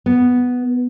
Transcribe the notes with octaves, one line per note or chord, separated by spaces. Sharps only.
B3